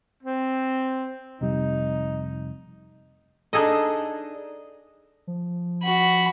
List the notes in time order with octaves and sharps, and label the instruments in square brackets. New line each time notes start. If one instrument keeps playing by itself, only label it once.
[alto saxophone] C4
[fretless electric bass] F1 C3 G3 [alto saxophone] D#4
[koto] D4 D#4 G#4 A4 D#5
[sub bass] F3
[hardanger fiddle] F#4 B5